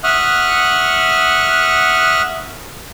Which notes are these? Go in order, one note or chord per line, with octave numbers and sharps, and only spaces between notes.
E5 F#5 C#6 D#6 F6 F#6